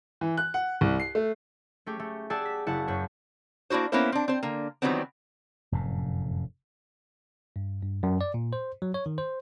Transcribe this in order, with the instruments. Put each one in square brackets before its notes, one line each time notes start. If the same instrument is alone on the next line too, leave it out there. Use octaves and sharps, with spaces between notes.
[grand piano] E3
F#6
F#5
C2
C7
A3
[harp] A3 C#4 G4 G#4
A3
G4 G#4 D5 F#5 A5 E6
B6
F#1 E4 F#5 A5
F#2 B4 C#5
[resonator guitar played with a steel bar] A#3 D4 E4 F#4 C5
A#3 B3 C#4 E4 A#4 C5
C4 D4
C4 C5
D3 A#3
D#3 E3 F#3 G3 B3 C4
[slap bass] F1 F#2 A2
[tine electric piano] G2
G2
F#2
D5
A#2
C5
F#3
C#5
D#3
C5